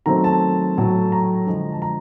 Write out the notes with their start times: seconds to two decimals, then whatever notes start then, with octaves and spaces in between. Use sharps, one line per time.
0.06 D#3 F#3 A3 C4 A#5
0.24 A5
0.77 A2 F#3 A3
1.12 A#5
1.46 D3 F3 G#3
1.72 A5
1.82 A#5